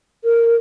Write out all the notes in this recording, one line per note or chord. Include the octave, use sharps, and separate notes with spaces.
A#4